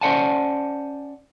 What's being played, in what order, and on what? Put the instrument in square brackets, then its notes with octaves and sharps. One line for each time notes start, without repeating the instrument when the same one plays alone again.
[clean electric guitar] C#4 C5 D5 F#5 G#5 A5